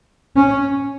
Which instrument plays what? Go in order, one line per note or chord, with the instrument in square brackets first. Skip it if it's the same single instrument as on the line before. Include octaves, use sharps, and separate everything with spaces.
[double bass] C#4